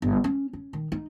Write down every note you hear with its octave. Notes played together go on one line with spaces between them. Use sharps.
G1
C#4
C#4
D#3
D#4